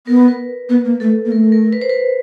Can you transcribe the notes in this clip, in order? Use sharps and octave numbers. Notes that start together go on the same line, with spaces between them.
B3 A#4
B4
B3 B4
A#3
A3 A4
A#3
A3 A#4
A#4
B4
C5
B4